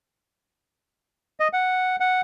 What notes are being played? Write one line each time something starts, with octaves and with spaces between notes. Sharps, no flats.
D#5
F#5
F#5